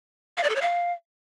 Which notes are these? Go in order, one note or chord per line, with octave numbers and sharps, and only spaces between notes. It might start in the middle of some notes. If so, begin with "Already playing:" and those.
F5
D5
A4
C#5
F5